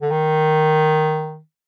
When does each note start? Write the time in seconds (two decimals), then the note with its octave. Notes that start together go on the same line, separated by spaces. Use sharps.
0.02 D3
0.11 D#3